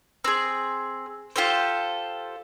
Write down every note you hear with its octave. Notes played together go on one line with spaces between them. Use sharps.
C4 G#4
F4 G4 A4 C5